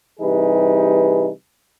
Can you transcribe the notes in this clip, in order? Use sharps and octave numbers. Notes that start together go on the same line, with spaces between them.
C3 E3 G3 D#4 G#4 B4